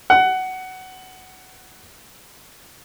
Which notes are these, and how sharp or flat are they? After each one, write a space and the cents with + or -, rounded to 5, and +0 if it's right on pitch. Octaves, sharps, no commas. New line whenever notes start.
F#5 +15